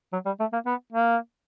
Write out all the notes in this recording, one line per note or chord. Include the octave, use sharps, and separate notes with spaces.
F#3
G3
A3
A#3
B3
A#3